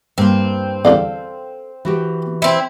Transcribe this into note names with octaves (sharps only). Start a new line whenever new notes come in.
G2 A#3 C4
E2 G2 D3 A4 F5
E3 F#4 G4
C4 E4